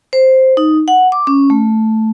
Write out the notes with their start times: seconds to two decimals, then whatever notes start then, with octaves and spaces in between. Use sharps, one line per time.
0.13 C5
0.57 D#4
0.88 F#5
1.12 D6
1.27 C#4
1.50 A3